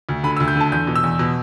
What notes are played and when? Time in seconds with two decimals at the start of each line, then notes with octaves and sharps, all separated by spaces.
0.09 D2
0.23 D3 B5
0.37 E6
0.40 D2
0.48 G6
0.56 D3 A5
0.72 E2 G6
0.87 B2
0.96 E6
1.04 E2
1.19 B2